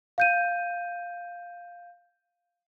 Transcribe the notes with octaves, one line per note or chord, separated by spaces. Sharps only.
F5 G6 D#7